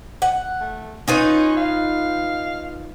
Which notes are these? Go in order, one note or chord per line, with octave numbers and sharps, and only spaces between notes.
F#5
A3
C#4 D#4 F4 B4
F5